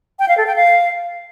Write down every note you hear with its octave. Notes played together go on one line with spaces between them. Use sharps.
G5
F5
A4
G5
F5